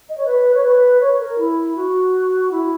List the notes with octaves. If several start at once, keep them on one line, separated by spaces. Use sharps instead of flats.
D#5
C#5
B4
C#5
B4
C#5
A#4
E4
F#4
E4